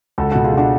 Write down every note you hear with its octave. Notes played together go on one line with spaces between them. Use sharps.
C#2 F#4 A4
B2 F#4 A4
F4 G#4
B2 D4 F#4